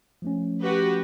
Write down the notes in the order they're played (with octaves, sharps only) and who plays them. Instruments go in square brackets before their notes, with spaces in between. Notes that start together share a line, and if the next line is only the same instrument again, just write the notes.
[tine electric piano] F3 A3 C#4
[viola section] F#4 G4 B4